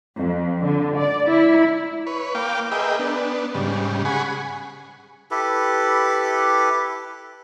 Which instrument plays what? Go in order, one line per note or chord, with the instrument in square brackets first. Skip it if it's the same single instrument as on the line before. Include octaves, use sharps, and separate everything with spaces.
[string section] F2
D3
D5
E4
[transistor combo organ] B4 C#5
A#3 F5 G5 D6
G#4 A#4 B4 D#5 E5 G5
B3 D4
G#2 C#3 G3
G#4 F#5 G#5 B5 C#6
[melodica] E4 G4 A4 B4